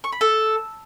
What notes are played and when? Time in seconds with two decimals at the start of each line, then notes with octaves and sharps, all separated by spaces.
0.04 C#6
0.12 B5
0.21 A4